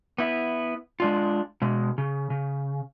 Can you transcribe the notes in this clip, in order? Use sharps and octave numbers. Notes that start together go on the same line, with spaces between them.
B3 E4
G#3 D4 F4
B2 G#3
C#3
C#3